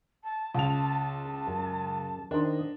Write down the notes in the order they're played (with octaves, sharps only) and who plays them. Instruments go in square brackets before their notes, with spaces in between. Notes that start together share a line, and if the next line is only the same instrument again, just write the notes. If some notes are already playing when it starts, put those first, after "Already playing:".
[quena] A5
[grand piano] C#2 F7 [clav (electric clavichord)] F4 [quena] A5
[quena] A5
[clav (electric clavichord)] F#2
[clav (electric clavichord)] D#3 C5 [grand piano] D4 [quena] D#5